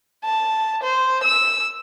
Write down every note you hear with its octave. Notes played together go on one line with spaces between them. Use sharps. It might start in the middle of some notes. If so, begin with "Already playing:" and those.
A5
C5
E6